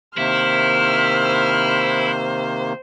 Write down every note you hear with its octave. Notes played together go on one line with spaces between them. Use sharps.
C3 D#3 A#3 E4 C5 F6